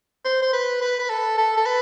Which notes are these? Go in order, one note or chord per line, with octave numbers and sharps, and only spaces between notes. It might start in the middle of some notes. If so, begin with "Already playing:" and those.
C5
C5
B4
B4
B4
A4
A4
A4
B4